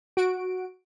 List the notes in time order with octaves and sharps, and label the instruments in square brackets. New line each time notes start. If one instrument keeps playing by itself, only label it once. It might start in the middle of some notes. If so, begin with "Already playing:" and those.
[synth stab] F#4 D7